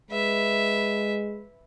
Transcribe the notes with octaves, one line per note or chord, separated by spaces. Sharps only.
G#3 B4 E5